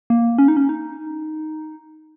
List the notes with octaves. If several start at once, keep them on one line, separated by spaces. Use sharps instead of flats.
A#3
C#4
D#4
C#4
D#4